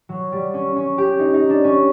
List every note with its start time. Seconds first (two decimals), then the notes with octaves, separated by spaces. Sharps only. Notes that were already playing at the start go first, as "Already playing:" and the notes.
0.09 F#3
0.32 G3
0.54 C#4
0.76 C#4
0.98 G4
1.19 D#4
1.34 D#4
1.50 D4
1.64 C#4